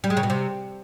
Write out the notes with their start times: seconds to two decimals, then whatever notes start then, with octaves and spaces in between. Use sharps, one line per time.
0.04 G3
0.10 G#3
0.17 C#3
0.23 B2
0.30 C3